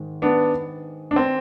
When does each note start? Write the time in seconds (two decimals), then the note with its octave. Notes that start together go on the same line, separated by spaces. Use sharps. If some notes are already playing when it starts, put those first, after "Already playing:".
Already playing: G#2 D#3 G#3
0.22 B3 D4
1.11 D4
1.16 C4